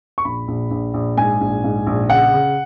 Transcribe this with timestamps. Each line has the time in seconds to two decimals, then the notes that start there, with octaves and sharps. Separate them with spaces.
0.18 C#6
0.25 A#1 B5
0.48 A#1
0.71 A#1
0.94 A#1
1.17 G#2 G#5
1.41 A#1
1.64 G#2
1.87 A#1
2.10 C#3 F#5
2.34 C#3